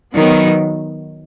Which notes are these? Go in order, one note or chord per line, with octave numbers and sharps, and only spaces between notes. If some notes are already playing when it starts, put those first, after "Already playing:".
D#3 F#3 B3